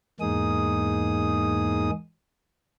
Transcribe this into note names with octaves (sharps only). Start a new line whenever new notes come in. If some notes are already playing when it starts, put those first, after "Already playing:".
E2 G#2 A#3 D#4 G#4 D#6